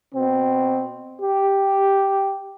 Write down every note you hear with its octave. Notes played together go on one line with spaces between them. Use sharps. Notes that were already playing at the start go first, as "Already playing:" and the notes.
B2 C4
G4